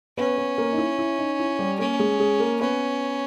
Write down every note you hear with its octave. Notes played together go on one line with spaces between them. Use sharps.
B3 C#4 B4
B3 B4
A#3 A#4
D#4
E4
E4
D#4
E4
G3 G4
A#3 C#4 A#4
G#3 G#4
G#3 G#4
A#3 A#4
B3 C#4 B4